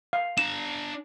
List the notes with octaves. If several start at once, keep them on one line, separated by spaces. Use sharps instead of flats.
F5
D4 A#5 E7